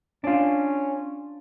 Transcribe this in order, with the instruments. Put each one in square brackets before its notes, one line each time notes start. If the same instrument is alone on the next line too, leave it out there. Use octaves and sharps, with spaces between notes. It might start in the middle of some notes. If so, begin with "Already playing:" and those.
[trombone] C#4 [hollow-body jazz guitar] D4 F4